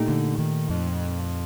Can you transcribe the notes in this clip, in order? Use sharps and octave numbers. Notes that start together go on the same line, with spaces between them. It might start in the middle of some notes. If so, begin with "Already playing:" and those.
Already playing: A#2 A3 D#4 G4
D3
D#3
F2